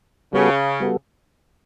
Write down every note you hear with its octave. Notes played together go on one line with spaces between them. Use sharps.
C#3 G3 B3 F#4 A4
G3 B3 F#4 A4